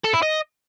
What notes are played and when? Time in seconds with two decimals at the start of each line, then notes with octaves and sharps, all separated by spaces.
0.04 A4
0.13 E4
0.22 D#5